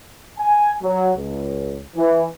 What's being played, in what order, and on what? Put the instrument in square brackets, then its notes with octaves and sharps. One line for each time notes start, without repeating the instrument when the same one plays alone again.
[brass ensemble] G#5
F#3
C#2
E3